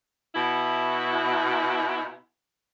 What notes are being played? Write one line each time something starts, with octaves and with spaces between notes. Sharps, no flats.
B2 E4